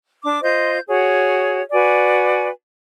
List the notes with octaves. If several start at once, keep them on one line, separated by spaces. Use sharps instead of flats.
D4 D6
F4 C5 D#5 G6
F#4 G#4 C#5
F#4 B4 D5 G#5